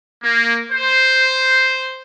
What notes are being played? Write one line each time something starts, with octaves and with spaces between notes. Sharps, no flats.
A#3
C5